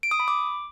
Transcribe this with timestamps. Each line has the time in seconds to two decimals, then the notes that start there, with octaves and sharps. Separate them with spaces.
0.03 D7
0.11 D#6
0.20 B5
0.28 D6